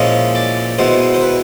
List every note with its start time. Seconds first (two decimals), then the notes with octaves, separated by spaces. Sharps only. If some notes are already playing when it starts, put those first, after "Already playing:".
Already playing: A#2 F3 G#3 C#4 E4 D#5
0.35 D5
0.79 B2 G#3 B3 E4 C5
1.14 C5
1.22 B4